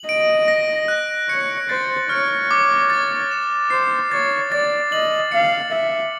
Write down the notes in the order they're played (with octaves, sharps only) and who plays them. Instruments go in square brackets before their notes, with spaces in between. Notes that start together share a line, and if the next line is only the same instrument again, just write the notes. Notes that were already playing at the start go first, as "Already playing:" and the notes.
Already playing: [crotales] F#7
[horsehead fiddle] D#5 [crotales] D7
[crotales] A#6
F#6
[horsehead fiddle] C#5 [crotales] C#7
[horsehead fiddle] C5 [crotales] A6
[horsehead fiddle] C#5 [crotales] F6
[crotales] D6
A6
E7
[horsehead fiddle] C5 [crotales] C7
[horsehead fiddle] C#5 [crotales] A6
[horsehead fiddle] D5 [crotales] A6
[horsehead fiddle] D#5 [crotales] F#7
[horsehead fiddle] F5 [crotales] C#7
[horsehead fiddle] E5 [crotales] A6